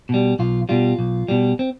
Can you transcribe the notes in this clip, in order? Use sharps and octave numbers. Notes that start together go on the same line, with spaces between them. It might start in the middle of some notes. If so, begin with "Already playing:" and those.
B2 G3
B1 F4
B2 G3 F4
B1
B2 G3
C4